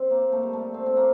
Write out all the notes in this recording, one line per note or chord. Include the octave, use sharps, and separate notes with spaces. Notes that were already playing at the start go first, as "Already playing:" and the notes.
Already playing: C4
A#3
A3
G3
A3
C4
C4
A#3